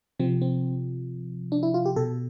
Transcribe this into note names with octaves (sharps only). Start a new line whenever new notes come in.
C3 F3 C4
C4
D4
E4
F4
G4
B2 A4